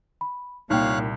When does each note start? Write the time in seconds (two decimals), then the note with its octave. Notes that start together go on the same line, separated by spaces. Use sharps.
0.21 B5
0.70 C2 A#2 D#4 C#5 F5 G5 F#6